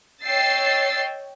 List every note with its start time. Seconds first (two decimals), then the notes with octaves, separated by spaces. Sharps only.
0.24 C#5 D#5 G5 E6 A6 C7